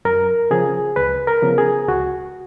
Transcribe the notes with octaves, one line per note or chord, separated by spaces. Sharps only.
F#2 A#4
C#3 F3 G#4
C#2 B4
A#4
C#3 F3 B3
G#4
C#2 F#4